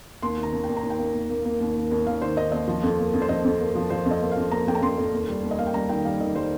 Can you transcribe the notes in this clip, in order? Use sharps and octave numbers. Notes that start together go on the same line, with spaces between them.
D#2 C6
D#3
A#5
D#2
D#2 G5
A#5
D#2
G5
A#3
D#2
A#3
A#3
D#2
D#2
D#2
D#2 F5
D#3 C5
D#3 D#5
D#2 D#5
F3
F2
A#3
F2
C5
F2 D#5
F2
A#3
F3
F3 C5
F2
D#5
A#3
F5
F2
A#3 A#5
F2 G5
A#5
F2 C6
F2
D#2
G3
D#2
D#5
A#3 F5
G5
G3 A#5
D#3 G5
G3 F5
D#3 D#5
G3 C5